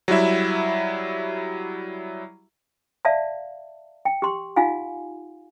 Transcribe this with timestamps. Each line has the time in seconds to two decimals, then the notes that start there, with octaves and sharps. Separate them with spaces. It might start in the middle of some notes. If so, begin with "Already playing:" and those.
0.08 F#3 G3 E4 E5
3.05 D5 E5 F5 A5
4.05 G5
4.22 G4 C6
4.56 D#4 F4 F5 F#5 G#5